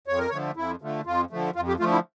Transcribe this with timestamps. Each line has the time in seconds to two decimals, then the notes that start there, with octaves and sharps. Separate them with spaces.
0.07 F2 C#5
0.19 A#4
0.30 D3 F3 A3 C#5
0.56 F2 E4
0.82 D3 F3 A3
1.05 F2 F4
1.31 D3 F3 A3
1.56 F2 F4
1.68 G4
1.79 D3 F3 A3 F4
1.92 E4